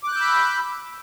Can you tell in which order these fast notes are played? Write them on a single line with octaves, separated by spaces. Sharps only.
D6 F#6 G6 E6 B5